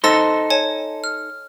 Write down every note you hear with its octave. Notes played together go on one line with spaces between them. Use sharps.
D#4 A4 C5 E6 A6 A#6
C#5 G#5 A5
F6